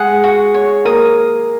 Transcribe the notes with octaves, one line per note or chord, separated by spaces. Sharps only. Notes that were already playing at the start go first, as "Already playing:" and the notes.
Already playing: G#3 G#4 F#5
F#4
C#5
A#3 A#4 D#6